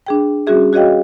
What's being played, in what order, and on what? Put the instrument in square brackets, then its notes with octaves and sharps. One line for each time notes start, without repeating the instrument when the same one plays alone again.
[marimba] D4 G#4 G5
G3 C#4 F#4 G#4 E5
F#4 G#4 C#5 D#5 F5 G5